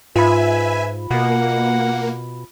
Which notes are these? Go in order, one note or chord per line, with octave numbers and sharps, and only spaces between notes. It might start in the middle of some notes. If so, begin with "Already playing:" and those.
G#2 F4 B4 E5 G#5 B5
B2 A#3 F#5